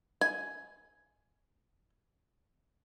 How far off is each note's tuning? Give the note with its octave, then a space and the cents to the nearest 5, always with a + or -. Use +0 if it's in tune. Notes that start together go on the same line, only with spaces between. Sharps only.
G#5 +5